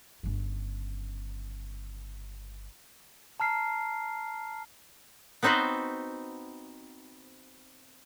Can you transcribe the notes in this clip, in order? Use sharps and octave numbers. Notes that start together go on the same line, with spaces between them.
G1 C#3
A5 A#5 F6 C7
B3 C4 D#4 F#4 B4 C5